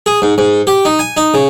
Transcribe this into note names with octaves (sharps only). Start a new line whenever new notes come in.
G#4
G#2
G#2
G4
D#4
G#5
D#4
C#3